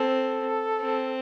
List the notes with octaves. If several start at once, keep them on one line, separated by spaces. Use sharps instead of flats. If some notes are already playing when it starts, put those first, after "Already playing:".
Already playing: C4 A4
C4